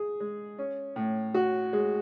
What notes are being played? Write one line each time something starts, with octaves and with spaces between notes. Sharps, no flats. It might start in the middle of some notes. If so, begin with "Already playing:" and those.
Already playing: G#4
G#3
C#4
A2
F#4
G#3